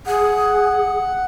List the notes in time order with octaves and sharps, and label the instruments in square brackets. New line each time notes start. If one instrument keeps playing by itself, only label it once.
[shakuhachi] G#4 [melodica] F#5